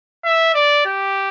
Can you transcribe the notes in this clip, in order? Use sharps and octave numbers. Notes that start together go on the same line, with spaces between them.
E5
D5
G4